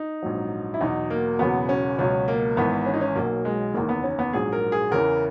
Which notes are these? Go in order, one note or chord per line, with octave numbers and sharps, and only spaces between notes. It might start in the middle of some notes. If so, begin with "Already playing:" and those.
Already playing: D#4
A#1 G#2 F#3
E4
E2 B2 F#3 D#4
A#3
E1 E2 C#3 F#3 B3
C#4
C#2 B2 F#3 C#4
A#3
G#1 G#2 E3 B3
C#4
D#4
C#4
B1 B2 F#3 A#3
G#3
F#1 E2 D#3 A#3
B3
C#4
B3
A#1 G#2 F#3 G#4
A#4
G#4
E2 C#3 E3 A#4